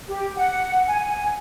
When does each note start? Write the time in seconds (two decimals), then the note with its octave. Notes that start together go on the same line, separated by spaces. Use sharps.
0.08 G4
0.37 F#5
0.88 G#5